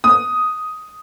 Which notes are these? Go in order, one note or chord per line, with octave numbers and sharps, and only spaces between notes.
D#6